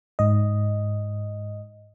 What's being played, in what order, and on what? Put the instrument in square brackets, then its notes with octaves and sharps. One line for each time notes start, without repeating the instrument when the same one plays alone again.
[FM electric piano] G#2 D#5